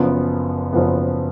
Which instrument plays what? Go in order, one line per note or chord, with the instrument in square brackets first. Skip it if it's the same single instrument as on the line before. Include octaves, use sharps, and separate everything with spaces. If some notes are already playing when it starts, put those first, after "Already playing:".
Already playing: [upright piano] F#1 F#2 F3 B3
F#1 F#2 F3 B3